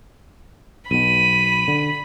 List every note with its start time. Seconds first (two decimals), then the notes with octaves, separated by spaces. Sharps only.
0.91 B1 B2 B5 D#7
1.68 D3